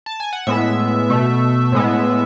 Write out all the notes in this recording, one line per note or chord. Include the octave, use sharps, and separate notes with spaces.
A5
G#5
F#5
A2 G#3 B3 E5
B2 A3
A2 G#3 B3